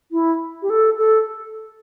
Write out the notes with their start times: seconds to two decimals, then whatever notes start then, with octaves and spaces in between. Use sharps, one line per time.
0.12 E4
0.62 G4
0.70 A4
0.98 A4